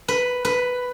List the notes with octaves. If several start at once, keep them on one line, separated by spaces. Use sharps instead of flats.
B4
B4